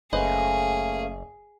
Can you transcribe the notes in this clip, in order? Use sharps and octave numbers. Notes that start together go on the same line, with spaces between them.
F#1 A3 A#3 C#4 G#4 B4 C5 D#5